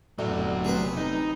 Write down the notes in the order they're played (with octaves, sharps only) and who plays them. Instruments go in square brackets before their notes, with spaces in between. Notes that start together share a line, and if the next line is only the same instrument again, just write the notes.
[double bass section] F1 D2 D3 [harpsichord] A2 [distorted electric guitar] F#3 B3 [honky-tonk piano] D5
[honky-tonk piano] C3 [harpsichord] G#4 B4
[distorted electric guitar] D#4